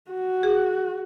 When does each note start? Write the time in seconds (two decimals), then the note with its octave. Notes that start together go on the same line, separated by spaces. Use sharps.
0.11 F#4
0.43 G#4